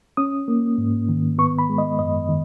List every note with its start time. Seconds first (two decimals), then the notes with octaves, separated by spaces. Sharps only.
0.17 C#4 D#6
0.48 A#3
0.78 G#2
1.09 D#3
1.38 B3 C#6
1.59 B5
1.69 G#3
1.78 D#5
1.99 F#2 D#5
2.29 D#3